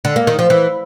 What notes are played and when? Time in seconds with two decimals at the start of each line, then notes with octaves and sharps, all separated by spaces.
0.05 D3
0.16 A#3
0.27 D#3
0.39 F3
0.50 E3